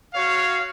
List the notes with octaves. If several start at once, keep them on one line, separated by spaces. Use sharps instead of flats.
F#4 C#5 F5